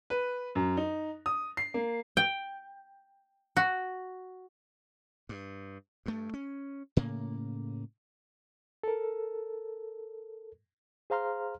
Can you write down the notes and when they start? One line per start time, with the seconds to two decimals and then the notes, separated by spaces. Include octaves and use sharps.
0.10 B4
0.55 F#2
0.77 D#4
1.26 D#6
1.57 C7
1.74 A#3
2.17 G5
3.57 F#4
5.29 G2
6.06 G2 A3
6.34 C#4
6.97 A2 C#3 A#3
8.84 A4 A#4
11.10 G#4 C5 F5 A#5 C6 F6